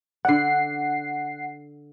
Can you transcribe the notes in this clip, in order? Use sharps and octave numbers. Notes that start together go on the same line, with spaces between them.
D3 D5 F#5 C7